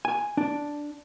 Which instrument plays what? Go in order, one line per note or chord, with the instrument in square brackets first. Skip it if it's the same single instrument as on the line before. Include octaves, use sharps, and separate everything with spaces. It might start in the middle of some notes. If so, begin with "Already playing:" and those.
[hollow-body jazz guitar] G#5
D4